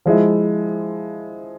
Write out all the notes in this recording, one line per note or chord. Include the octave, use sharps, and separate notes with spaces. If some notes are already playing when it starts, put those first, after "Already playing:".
F3 G#3 E4